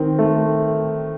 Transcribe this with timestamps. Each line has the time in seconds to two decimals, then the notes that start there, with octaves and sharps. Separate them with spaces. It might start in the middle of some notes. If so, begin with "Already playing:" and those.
Already playing: D#3 C4
0.19 A3